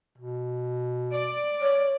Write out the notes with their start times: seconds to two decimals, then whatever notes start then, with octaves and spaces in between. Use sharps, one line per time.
0.18 B2
1.11 D5
1.61 C#5